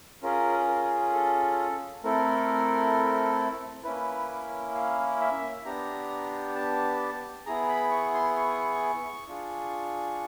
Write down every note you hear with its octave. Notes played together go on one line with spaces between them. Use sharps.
C#4 F4 G#4 A#4
A#4
A4
A3 C4 E4 A4 A#4
A#3 C#4 E4 B4
F5
E5
B3 D4 G4 A#5
A5
B3 E4 G#4 A#5
B5
C#6
C6
C#6
D4 F4 G#4